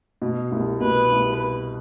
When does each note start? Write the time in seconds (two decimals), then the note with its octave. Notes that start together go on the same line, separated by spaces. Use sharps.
0.22 B2
0.52 C2
0.81 B2 B4
1.11 C2